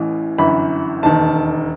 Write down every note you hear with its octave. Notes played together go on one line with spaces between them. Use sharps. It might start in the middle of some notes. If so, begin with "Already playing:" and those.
Already playing: A1 A2 E3
G1 F#2 E3 B5
E1 D#2 D#3 A5